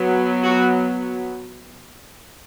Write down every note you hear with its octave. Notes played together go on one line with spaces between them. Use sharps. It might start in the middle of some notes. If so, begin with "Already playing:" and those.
Already playing: F#3 B3
F#4